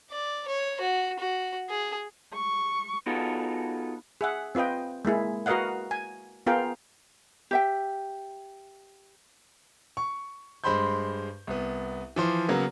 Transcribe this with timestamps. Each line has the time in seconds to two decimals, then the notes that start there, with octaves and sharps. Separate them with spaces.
0.10 D5
0.48 C#5
0.80 F#4
1.19 F#4
1.69 G#4
2.35 C#6
3.06 B3 D#4 F4 F#4 G#4 A4
4.21 G#4 E5 F#5
4.55 C4 F4 B4 D#5 G5
5.05 G#3 A#3 E4 G#4
5.46 F#4 A#4 B4 D#5 F5 F#5
5.91 G#5
6.46 B3 F4 G#4 A#4 F5 G5
7.51 G4 E5 G5
9.97 C#6
10.64 G2 G#3 C5 B5 C6 G6
11.47 C2 B3
12.16 E3 F3 C5
12.49 C#3 F#3 A#3 B3